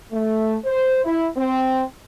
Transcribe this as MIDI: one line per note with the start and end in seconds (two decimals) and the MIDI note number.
0.11 0.55 57
0.65 1.01 72
1.04 1.28 64
1.37 1.84 60